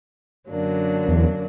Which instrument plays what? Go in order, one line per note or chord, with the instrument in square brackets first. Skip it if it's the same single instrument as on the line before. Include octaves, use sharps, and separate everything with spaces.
[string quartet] F#2 D3 F#3 A#3 D4
[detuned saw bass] E2